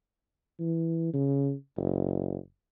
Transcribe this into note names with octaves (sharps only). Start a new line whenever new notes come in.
E3
C#3
F#1